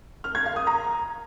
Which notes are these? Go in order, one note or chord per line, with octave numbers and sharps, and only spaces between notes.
F6
G#6
F5
D#6
A#5